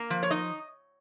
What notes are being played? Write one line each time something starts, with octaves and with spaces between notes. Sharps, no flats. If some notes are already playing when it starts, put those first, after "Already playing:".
Already playing: A#3 F5
F3
C#5
D#4 D#5